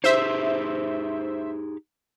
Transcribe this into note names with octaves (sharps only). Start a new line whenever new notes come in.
D#4 G4 G#4 C5 E5